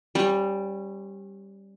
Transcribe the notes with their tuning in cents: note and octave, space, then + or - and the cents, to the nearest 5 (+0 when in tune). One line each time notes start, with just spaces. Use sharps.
G3 +0 C#4 -25